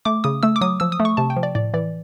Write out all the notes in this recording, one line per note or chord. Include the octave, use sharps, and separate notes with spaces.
A3 D6
C#3 D#6
A3 E6
D6
F#3 D#6
F3 E6
D#6
A3
C#6
C3 A5
G5
F3
D5
A2 D5
E3 D5